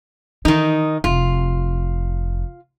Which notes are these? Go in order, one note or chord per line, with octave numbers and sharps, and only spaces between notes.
D#3 E3 D#4
F1 F4